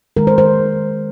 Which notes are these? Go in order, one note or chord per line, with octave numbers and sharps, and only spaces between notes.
D#3 G#3 A#4
C5
C5